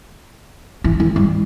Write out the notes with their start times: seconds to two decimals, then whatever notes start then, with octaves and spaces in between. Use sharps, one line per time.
0.84 E3
1.00 E3
1.16 G3